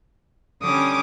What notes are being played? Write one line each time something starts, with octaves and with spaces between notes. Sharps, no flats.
D3 G3 C#4 D6 D#6